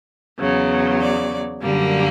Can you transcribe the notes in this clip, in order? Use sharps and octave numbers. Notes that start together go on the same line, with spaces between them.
E2 C#3 F#3
D5
F#2 D3 G3 A#3